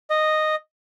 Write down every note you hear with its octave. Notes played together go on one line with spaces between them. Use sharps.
D#5